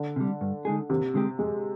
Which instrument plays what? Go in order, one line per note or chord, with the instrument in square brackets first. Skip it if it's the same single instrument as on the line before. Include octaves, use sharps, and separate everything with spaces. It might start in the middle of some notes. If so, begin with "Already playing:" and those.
Already playing: [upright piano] D3
[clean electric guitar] C3 G3
G2
D3 G#3 D#4 G#4
[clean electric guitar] D#2 [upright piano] C3
[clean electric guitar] D3 G#3 C4 G4
[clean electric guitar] F2 [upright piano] G#3